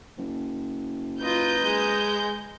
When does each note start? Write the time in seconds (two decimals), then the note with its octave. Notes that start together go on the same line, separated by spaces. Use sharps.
0.18 F#1
1.20 F4 B4 D#5 A#5 G6
1.63 G#3